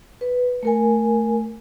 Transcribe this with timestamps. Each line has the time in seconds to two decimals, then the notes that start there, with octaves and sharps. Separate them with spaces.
0.21 B4
0.63 A3 A#4 G#5